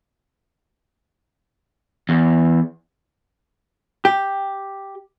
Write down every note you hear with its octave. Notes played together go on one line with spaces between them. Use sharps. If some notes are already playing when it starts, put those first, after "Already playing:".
E2
G4